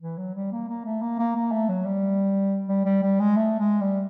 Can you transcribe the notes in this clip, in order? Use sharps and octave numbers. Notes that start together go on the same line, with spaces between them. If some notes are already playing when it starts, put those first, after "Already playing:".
E3
F#3
G3
A#3
A#3
A3
A#3
A#3
A#3
A3
F#3
G3
G3
G3
G3
G#3
A3
G#3
G3